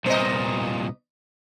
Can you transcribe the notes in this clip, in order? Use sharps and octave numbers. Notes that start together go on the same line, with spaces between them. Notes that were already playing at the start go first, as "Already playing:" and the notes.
C2 A#2 B3 D#5